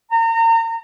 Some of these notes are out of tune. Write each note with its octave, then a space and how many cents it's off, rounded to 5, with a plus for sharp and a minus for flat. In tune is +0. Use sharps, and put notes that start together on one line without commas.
A#5 -35